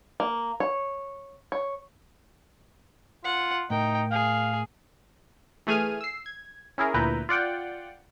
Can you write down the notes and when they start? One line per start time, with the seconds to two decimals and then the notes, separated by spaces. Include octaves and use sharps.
0.20 A#3
0.60 C#5
1.52 C#5
3.24 F4 F#5
3.70 A2 D#4 A#4 G5
4.11 G#4 F5
5.67 E3 A3 G#4 G#5 F6 D#7
6.01 E6 C7
6.26 G#6
6.78 C#4 E4 G#4 A#4
6.94 D2 A#2 E4 B4 A#5 G6
7.29 F4 D5 F#5 G5